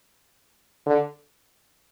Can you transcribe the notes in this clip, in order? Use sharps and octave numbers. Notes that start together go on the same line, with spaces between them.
D3